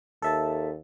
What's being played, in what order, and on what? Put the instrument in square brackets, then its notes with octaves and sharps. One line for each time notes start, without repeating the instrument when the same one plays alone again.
[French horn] D#2 [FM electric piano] A4 E5 A5